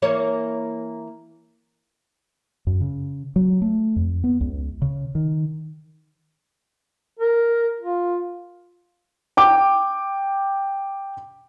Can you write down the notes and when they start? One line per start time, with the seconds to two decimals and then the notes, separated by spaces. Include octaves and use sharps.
0.02 E3 A#3 C#5
2.67 F#2
2.81 C#3
3.36 F#3
3.62 A3
3.96 F2
4.24 B3
4.41 C#2
4.82 C#3
5.15 D#3
7.19 A#4
7.80 F4
9.37 G5 D6